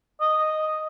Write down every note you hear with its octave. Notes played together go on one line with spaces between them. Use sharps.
D#5